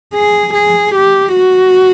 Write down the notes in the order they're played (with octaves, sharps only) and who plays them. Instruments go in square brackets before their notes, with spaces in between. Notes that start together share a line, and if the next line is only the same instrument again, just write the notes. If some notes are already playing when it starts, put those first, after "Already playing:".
[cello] G#4
G#4
G4
F#4